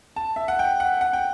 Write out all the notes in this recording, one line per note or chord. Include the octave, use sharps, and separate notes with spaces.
A5
E5
F#5
G5
F#5
F#5
G5